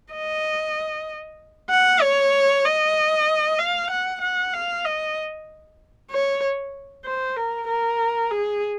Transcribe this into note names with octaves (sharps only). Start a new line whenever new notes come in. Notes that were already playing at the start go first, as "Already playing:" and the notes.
D#5
F#5
C#5
D#5
F5
F#5
F#5
F5
D#5
C#5
C5
A#4
A#4
G#4